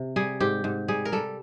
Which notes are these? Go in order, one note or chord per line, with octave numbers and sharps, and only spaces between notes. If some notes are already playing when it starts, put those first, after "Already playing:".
Already playing: C3
G3 G#4
G#2 G4
G#2
G3 G#4
A#4
G3 A4